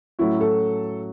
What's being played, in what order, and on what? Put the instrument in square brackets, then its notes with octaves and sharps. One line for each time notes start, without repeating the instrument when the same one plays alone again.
[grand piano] A2 F#3 A3 C#4 F#4 [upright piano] E4
[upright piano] A4